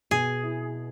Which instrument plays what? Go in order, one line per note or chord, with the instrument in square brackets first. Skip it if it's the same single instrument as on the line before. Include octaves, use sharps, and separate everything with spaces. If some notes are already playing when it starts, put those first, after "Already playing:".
[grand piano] B2 [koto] G#4
[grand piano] E4